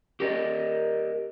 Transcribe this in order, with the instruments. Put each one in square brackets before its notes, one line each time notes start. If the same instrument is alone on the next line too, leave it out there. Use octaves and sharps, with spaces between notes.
[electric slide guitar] G4 A#4 D5 D#5